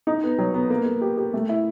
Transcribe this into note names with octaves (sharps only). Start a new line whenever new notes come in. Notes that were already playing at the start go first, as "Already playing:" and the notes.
D#4
B3
F#3
B3
A#3
A#3
G4
G4
A3
E4